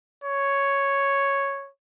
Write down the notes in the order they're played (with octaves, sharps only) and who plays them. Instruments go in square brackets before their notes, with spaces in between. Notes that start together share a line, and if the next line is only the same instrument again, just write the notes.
[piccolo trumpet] C#5